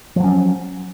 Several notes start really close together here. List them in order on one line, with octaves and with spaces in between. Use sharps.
F3 F#3 C#4